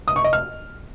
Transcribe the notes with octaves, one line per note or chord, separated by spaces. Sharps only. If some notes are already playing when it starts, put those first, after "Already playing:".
D#6
C#6
D#5
F6